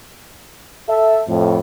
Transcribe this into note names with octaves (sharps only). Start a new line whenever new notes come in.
A4 E5
F2 A2